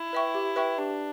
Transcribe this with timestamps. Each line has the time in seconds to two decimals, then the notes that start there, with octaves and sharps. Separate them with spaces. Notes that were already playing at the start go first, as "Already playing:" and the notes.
Already playing: E4
0.13 B4 E5 G5 C#6
0.35 G4
0.56 B4 E5 G5 C#6
0.78 D4 G4